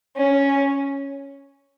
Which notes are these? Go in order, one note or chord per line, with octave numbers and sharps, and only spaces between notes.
C#4